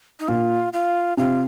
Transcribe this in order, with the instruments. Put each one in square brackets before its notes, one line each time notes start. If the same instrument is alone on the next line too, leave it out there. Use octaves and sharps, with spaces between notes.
[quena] D#4
[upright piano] A#2 [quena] F4
[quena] F4
[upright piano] C3 [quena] F4